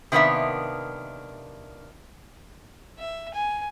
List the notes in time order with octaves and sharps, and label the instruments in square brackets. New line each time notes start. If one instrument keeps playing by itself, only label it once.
[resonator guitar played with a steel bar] C3 D#3 A#3 B3 D4 E5
[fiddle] E5
G#5